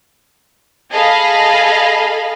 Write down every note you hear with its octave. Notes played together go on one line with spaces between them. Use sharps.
G#4 A4 D#5 F5 B5